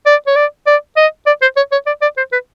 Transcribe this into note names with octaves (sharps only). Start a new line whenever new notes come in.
D5
C#5
D5
D5
D#5
D5
C5
C#5
C#5
D5
D5
C5
B4